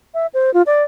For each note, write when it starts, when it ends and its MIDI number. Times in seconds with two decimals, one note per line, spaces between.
0.14 0.27 76
0.34 0.53 72
0.54 0.62 65
0.66 0.84 74